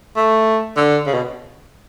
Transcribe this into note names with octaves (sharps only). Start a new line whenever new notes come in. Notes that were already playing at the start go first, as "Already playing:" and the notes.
A3
D3
C#3
B2